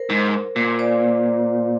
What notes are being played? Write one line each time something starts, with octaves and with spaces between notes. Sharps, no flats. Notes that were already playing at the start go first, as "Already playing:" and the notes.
Already playing: A#4 C5
G#2
A#2
C5 D5